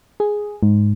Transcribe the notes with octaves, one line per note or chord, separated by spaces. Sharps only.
G#4
G#2